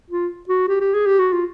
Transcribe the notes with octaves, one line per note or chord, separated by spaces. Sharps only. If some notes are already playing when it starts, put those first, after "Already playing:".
F4
F#4
G4
G4
G#4
G4
F#4
F4